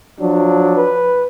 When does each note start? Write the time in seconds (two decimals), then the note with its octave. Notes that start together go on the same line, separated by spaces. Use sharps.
0.19 F3 F#3 D4
0.77 B4